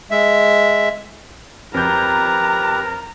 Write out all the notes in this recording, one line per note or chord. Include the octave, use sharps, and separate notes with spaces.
G#3 E5
F2 G4 A#4 B4 A#5 G6